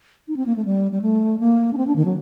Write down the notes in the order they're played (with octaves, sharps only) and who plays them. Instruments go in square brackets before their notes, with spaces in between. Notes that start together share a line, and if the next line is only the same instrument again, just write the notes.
[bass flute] D#4
C4
A#3
A3
G3
G3
A3
A#3
D4
C4
D4
D#3
F#3